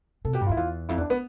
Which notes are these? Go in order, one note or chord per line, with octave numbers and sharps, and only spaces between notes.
C3 A4
B2 G4
G2
F2 E4 F4
E2 F4
F2 E4
E2
D4
B3